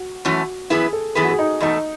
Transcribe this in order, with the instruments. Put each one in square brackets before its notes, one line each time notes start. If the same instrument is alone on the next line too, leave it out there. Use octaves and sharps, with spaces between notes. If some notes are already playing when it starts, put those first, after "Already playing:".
Already playing: [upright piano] F#4
[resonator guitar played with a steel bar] F#2 E3 A3 C#4 [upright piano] F#4
[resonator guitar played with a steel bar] F#2 E3 B3 E4 B4 [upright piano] G#4
[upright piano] A4
[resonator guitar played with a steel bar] F#2 E3 B3 E4 B4 [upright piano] G#4
[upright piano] F#4
G#4
D#4
[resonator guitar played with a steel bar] E2 B2 A3 [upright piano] D#4